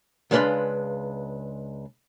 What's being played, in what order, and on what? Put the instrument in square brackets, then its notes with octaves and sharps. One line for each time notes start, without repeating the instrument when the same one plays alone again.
[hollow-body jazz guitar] C#2 G#3 D4 B4 F5 C6